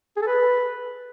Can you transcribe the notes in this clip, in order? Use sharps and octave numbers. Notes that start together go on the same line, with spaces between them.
G#4
A4
B4